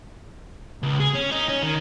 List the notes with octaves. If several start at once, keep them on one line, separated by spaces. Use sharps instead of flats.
C#2
G#4
C#4
D#4
C#4
D#3